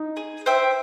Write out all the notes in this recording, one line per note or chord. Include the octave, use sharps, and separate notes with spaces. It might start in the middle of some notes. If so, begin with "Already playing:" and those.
Already playing: D#4
G#4
C5 E5 G5